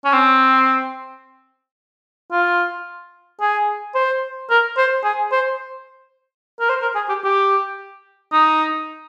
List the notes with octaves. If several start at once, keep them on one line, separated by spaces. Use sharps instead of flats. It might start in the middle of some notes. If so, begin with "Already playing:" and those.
C#4
C4
F4
G#4
C5
A#4
C5
G#4
C5
A#4
C5
A#4
G#4
G4
G4
D#4